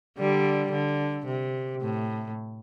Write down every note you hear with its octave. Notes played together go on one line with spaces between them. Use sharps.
D3 G3
D3
C3
A2